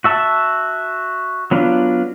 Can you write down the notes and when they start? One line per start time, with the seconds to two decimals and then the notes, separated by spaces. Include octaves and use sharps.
0.04 F#4 E5 A5
1.51 F#3 B3 D4 F4